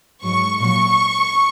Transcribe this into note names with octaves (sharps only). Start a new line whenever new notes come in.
G#2 F#3 C#6
A#2 F#3 C#6